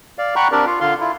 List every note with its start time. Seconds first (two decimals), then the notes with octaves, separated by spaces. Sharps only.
0.18 D5 F5
0.36 F#5 G5 A#5 B5 C#6 F#6
0.52 C4 D4 G4 A#4 D5
0.66 F4 F5
0.81 D3 F4 F5 C6
1.00 E4 F4